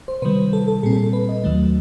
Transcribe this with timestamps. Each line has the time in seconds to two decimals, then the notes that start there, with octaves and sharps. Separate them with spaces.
0.08 C5
0.22 C3 D#3 G3 B4
0.53 A4
0.68 A4
0.83 A#2 G3 C4 G#4
0.93 A4
1.04 A4
1.13 B4
1.29 D#5
1.44 D#2 D#3 F#3 A3